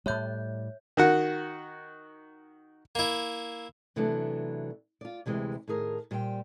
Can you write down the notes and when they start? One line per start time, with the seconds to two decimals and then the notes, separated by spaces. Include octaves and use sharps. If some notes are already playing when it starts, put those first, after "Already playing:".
0.06 A2 G3 C#5 E5 G6
0.97 D#3 F#4 F#5
2.95 A#3 E4
3.96 C3 E3 F#3 A3 B3 D4
5.01 F4 D5
5.26 D2 C3 E3 G#3 G4
5.68 A2 D#3 G#4 A#4
6.11 A#2 G3 C5 E5 G5